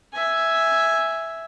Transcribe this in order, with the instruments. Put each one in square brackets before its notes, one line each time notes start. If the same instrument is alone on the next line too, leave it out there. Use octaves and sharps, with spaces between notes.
[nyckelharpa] E5 G#5